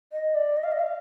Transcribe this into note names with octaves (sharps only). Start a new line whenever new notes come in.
D#5
D5
D#5
F5
D#5
F5